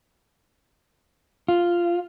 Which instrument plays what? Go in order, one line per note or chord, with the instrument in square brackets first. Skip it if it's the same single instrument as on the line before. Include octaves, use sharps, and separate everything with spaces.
[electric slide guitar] F4